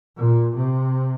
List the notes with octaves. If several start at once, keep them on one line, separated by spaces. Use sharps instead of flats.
A#2
C3